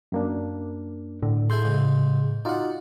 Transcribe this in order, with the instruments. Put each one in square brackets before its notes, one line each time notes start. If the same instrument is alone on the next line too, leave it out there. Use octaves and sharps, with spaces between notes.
[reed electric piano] F#2 A#3 D4
[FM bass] A2 [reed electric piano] D3
[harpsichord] E4 G#4 A4 [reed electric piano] C6 G6
[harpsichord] G#2 C#3
[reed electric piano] D#4 F4 F#4 [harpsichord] D5 F#5